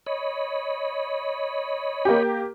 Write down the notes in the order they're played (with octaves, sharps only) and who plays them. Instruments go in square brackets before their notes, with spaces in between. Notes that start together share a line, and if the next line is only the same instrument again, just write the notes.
[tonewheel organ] C#5 D#5 B5
[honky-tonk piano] A#3 G4